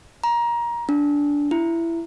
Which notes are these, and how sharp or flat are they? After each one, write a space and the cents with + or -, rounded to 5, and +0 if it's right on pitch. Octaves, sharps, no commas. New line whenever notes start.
A#5 +20
D4 -15
E4 +15